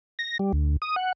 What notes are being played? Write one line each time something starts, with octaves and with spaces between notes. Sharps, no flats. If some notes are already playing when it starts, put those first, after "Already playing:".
A#6
G3
D2
D#6
F#5